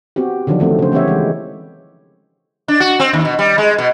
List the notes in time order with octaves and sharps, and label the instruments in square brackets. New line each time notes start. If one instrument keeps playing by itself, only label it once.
[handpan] B3 C4 F#4 G4
D3 D#3 F3 F#3 D4
D#3 F3 A3 B3 C4
C#3 C5
E3 B3 C4 G4 C#5 E5
E3 G#3
[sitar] D4
F#4
C4
D#2
B2
G3
G#3
B2